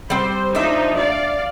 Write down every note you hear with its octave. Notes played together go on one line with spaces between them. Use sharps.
G3 C4 C5
F3 D4 D#4 E5
D5 F5